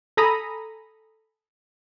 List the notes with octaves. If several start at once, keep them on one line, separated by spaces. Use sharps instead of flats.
A4 G#5 A#5 B5 D#6